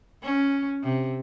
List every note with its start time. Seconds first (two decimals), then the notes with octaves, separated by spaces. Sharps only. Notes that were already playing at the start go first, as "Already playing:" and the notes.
0.23 C#4
0.83 C3